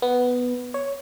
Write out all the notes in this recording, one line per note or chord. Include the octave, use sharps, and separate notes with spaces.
B3
C#5